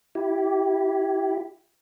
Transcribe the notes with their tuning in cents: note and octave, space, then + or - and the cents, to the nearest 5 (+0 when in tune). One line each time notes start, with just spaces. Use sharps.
E4 +0 G4 -20